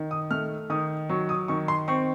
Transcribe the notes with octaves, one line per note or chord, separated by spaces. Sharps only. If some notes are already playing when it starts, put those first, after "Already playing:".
Already playing: D#3
D#6
A3 F6
D#3 D#6
F#3 C#6
D#6
D#3 C#6
C6
C4 C#6